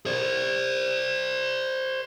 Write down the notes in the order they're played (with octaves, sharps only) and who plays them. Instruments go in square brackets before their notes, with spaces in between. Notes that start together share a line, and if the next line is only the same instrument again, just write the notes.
[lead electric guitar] C5 D5